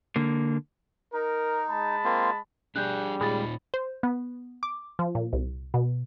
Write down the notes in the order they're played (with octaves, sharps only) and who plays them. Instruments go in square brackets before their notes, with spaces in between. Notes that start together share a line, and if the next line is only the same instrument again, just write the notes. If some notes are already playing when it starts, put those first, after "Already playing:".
[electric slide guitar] D3 A#3
[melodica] D#4 [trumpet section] A#4
[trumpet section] G#3 A5 B5
[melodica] A#3 C4 F4
[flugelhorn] G3 [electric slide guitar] D4 G#4 [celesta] F#6 G6
[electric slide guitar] A#2 D#4 F4 [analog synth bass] G#3 [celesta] B5 A6
[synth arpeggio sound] C5
B3
D6
F3
A#2
C2
B2